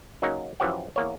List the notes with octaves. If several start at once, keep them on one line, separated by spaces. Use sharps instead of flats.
C#3 F#3 A#3 C#4 D#4
F#2 E3 F3 G4 C#5 F#5
E2 A#3 C#5